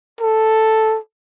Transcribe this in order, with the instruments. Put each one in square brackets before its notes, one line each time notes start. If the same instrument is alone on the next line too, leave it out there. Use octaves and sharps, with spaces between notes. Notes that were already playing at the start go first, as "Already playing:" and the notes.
[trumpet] A4